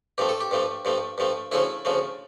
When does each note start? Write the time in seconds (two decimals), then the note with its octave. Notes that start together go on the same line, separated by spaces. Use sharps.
0.18 G2 F3 A3 G4
0.29 A4
0.41 G4
0.51 G2 F3 A3
0.85 G2 F3 A3
1.18 G2 F3 A3
1.52 D2 C#3 F3 A3 E4
1.85 D2 C#3 F3 A3